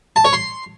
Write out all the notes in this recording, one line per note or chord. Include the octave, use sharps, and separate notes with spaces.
A5
C#5
C6